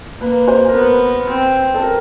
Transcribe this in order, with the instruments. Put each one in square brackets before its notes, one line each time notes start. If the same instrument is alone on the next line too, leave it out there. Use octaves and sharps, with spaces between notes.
[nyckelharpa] A#3 [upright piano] B4
[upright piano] C5
A#4
[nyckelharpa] B3 [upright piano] B4
[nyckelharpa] C4
[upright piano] A4
A#4